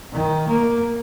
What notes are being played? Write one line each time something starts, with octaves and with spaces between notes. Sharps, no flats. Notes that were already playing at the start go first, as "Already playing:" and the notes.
D#3
A#3